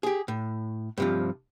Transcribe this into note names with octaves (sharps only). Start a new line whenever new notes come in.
G4 G#4
A2
G2 C3 F3